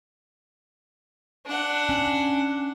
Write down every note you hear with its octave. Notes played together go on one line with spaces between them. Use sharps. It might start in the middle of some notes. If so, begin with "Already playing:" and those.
D4 F#5
C#4